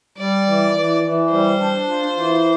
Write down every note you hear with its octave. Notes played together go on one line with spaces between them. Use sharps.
G3 D5
E3
E3
E3
G3 C5
D4
F4
E3